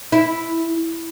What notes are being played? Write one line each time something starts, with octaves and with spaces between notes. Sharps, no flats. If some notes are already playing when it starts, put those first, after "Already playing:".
E4